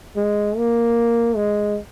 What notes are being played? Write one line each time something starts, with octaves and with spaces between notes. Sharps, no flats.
G#3
A#3
G#3